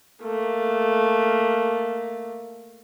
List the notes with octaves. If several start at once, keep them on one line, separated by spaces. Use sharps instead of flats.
A3 A#3